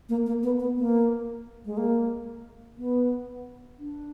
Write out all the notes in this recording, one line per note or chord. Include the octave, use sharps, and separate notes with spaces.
A#3
A#3
B3
B3
A#3
G#3
A#3
B3
D4